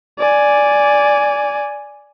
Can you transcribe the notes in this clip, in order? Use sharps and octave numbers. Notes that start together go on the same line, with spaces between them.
D5 G#5